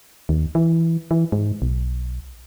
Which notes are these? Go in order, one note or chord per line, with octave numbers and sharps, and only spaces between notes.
D#2
E3
E3
G#2
B1